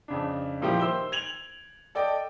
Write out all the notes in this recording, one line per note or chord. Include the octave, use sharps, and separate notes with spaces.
F2 C#3 D4
A#2 F3 G3 E4 G4
D#3 C5 E6 G7
G#6 F7 F#7
A4 D5 D#5 G5